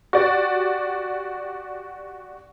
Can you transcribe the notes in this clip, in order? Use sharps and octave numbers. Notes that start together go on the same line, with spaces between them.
F#4 G4 D5